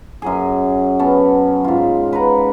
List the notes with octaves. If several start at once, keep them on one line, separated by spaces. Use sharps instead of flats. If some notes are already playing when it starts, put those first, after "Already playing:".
F#2 F#3 G#4
B3 C#4 A5
G#2 F4
B4 F#5 A#5